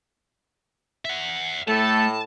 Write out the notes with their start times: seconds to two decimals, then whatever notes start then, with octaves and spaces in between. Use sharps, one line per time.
1.05 E5 F#5
1.68 A2 A3 A4 A5